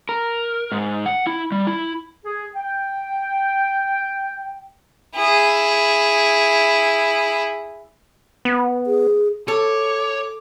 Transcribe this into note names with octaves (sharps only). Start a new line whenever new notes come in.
A#4
G#2
F#5
E4
G3
E4
G#4
G5
E4 G#4
B3
G#4
A4 C#5 D6